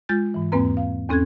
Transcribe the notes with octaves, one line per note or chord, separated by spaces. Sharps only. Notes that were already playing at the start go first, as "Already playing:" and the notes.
G#3 F4 G6 A6
G#2 E3
E2 G#2 A#3 C4 B4 A#5
F5
E2 C4 C#4 A4 F#6 G#6